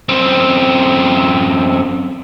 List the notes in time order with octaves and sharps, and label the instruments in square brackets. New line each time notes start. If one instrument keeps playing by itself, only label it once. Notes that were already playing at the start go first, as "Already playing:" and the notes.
[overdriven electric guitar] F#2 C4